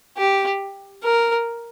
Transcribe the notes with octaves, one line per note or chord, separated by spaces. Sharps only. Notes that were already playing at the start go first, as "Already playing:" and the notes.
G4
A#4